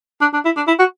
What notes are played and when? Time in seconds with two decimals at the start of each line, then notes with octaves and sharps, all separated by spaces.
0.21 D4
0.34 D4
0.45 E4
0.57 D4
0.68 E4
0.79 F#4